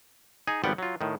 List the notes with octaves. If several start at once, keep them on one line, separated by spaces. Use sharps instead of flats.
D#4 G#4 G#5
G#1 F3 G3 B3 F#5 G5
F#3 F4
A2 D#3